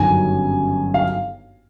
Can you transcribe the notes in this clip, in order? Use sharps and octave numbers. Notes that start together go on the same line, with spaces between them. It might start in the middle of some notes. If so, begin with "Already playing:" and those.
Already playing: G1 F#2 D#3 F#3 G#5
F5